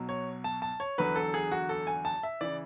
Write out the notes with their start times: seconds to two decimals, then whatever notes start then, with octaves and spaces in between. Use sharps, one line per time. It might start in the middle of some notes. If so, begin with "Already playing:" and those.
Already playing: B1 B2 F#3
0.09 C#5
0.44 A5
0.62 A5
0.80 C#5
0.98 E2 D3 F#3 B4
1.16 A4
1.34 G#4
1.52 F#4
1.69 A4
1.87 G#5
2.05 A5
2.23 E5
2.41 C#3 E3 D5